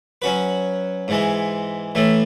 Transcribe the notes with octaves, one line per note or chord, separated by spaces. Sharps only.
F#3 C#4 F#4 B4
G#2 E3 G#3
A2 E3 A3